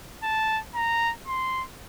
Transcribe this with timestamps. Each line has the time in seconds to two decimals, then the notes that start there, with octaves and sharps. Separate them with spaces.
0.23 A5
0.75 A#5
1.27 C6